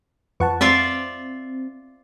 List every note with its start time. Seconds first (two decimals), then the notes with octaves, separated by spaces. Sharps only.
0.40 F2 B4 F#5 A5 C#6
0.61 C4 F4 D5 E5